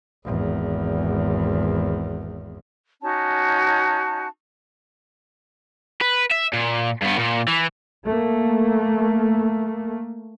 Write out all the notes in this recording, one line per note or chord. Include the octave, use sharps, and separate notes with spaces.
G#1 E2
C#4 D#4 F#4 A5
B4
E5
A#2
G2 B3
A#2
E3
A3 A#3